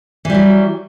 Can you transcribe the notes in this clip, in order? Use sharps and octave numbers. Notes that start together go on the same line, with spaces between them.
E3 F#3 G3